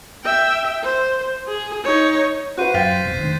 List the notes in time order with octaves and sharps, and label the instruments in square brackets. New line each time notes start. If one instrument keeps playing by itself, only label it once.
[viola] E5 G5
C5
G#4
D#4 C#5
[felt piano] F#4 B4 [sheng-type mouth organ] C5 [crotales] F#6 D#7
[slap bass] F#2 [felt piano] F5 G5 [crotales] A6 B6
[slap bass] E1 F2 B2
D#3 A3 D4